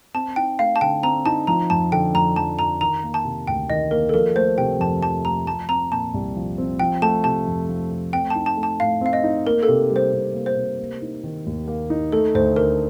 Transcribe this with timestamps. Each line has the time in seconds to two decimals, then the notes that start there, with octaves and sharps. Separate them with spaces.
0.14 C4 A5
0.36 D#4 G5
0.59 A3 F5
0.76 A5
0.81 D3 G5
1.03 C4 A#5
1.26 D#4 A5
1.47 F3 A#5
1.70 F2 A5
1.92 D3 G5
2.14 F2 A#5
2.36 F3 A5
2.59 F2 A#5
2.81 D#3 A#5
3.03 A#3
3.14 A5
3.25 C3
3.47 D2 G5
3.70 D#3 D#5
3.91 A#3 A#4
4.09 A4
4.14 F3 A#4
4.35 A3 C5
4.58 C3 G5
4.80 F2 A5
5.03 F3 A5
5.25 A3 A#5
5.47 F3 A5
5.69 C4 A#5
5.91 A#2 A5
6.14 C2
6.36 F3
6.58 C4
6.80 F3 G5
7.02 A3 A5
7.24 C3 A5
7.47 F2
7.69 F3
7.91 A3
8.13 C4 G5
8.30 D#4 A5
8.46 A5
8.57 A3
8.63 A5
8.80 A2 F5
9.01 C4 F5
9.13 D#5
9.23 D#4
9.47 A#3 A#4
9.63 A4
9.68 C3
9.90 G3
9.96 C5
10.13 C3
10.34 A#3
10.46 C5
10.57 C3
10.79 A#3
11.02 D#4
11.24 D#3
11.46 D#2
11.68 A#3
11.90 D#4
12.12 A3 A4
12.35 D2 C5
12.56 D3 A#4